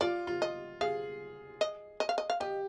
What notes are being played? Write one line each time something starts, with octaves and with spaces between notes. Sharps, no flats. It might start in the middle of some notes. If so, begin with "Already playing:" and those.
F4 D5
F4
D#5
G#4 F5
D#5
D#5
F5
D#5
F5
G4 D#5